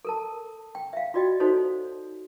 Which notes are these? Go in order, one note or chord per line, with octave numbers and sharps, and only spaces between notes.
A4 A#4 A5
G5
E5 F5
F4 F#4 D5 D#5 G5
D#4 F#4 A4 C5 C#5